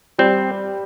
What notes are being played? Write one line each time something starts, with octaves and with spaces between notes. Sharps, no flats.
G3 C4